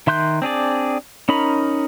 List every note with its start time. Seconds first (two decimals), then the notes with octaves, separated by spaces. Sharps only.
0.07 D#3 E5 C6 F#6 G6
0.42 C4 D4 G#4 D5
1.29 C#4 D#4 A#4 B5